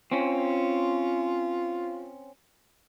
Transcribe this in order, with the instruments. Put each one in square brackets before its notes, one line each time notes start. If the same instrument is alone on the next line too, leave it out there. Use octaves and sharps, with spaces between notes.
[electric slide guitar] C4 C#4 [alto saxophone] F4